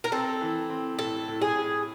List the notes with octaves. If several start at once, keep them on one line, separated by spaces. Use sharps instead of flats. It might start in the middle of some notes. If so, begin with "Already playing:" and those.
A#4
C4 A4
E3
C4
A2 A4
A2
G#4
A2